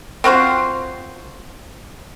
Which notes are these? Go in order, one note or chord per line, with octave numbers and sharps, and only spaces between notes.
C4 F4 F#4 C5